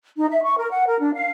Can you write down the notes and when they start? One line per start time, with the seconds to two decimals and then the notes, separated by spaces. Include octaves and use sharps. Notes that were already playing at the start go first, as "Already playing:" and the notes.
0.16 D#4
0.29 E5
0.43 C#6
0.56 A#4
0.70 F#5
0.87 A#4
1.00 D4
1.14 F5